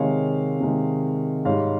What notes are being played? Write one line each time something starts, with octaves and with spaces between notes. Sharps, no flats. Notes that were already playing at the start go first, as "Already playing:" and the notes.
Already playing: C3 D#3 G#3 C#5 F5
C3 D#3 G#3
G#2 G3 C#5 F5